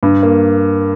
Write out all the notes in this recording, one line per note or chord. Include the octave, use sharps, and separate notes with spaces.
G2
A#3